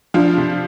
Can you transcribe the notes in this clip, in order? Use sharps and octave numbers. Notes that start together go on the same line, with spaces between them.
F3 D4 F4
C3